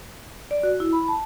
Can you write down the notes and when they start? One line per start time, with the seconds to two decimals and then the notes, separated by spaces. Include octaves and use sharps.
0.51 D5
0.63 F#4
0.80 E4
0.93 B5
1.08 A5